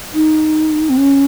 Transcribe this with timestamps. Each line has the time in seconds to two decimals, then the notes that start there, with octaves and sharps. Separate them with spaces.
0.14 D#4
0.89 C4
0.97 C#4